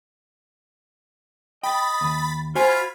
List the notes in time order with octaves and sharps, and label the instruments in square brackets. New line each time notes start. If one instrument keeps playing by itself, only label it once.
[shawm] D#5 [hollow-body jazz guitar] G5 [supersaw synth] B5 A6
[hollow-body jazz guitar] D#2
[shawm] F4 [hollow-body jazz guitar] F#4 C5 G#5 [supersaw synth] B5 F6 G#6